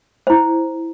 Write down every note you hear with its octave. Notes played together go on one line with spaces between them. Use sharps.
E4 C5